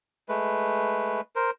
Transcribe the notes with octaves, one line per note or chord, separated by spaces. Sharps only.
G#3 A3 B4
A#4 C5